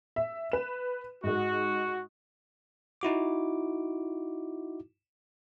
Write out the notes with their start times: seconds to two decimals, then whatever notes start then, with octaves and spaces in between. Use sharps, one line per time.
0.16 E5
0.52 B4 E7
1.24 G#2 G#3 F#4
3.01 D#4 E4 F#4 D6